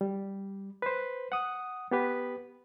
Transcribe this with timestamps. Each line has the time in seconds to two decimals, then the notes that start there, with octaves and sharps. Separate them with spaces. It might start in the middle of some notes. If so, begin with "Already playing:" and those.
0.01 G3
0.82 B4 C5
1.32 F#5 D#6
1.91 B3 G4 B4